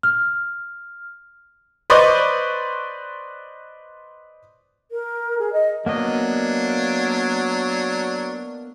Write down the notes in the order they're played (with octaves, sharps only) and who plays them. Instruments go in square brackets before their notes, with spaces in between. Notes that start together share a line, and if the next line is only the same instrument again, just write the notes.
[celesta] F6
[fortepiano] B4 C5 D5 D#5 C#6
[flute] A#4
G#4
D#5
[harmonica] F#3 D4 [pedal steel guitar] A#3 B3 D#5